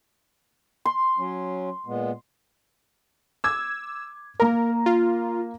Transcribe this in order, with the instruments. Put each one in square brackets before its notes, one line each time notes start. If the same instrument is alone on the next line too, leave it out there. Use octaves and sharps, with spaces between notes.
[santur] C6
[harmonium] F#3 C#4
A#2 G#3 B3
[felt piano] D6 G#6 [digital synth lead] E6
[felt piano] A#3 A#5 [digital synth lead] A#4
[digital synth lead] F4